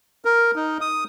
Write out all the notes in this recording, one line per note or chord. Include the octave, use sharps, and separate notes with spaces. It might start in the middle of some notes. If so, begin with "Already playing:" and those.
A#4
D#4
D#6